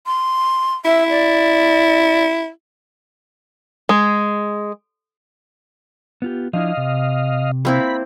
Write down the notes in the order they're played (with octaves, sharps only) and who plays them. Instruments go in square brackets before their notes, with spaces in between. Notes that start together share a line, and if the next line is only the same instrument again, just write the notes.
[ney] C6
[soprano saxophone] E4 [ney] E5
[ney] D5
[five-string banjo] G#3
[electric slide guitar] B3 F4 G4
[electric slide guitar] F3 D4 E4 [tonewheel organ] D#5 F5
[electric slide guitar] C3
[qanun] A#3 C4 E4 [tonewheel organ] B5